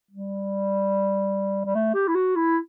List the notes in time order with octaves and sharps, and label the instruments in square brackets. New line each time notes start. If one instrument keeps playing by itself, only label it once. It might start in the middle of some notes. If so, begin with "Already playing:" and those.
[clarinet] G3
G3
A3
G4
E4
F#4
E4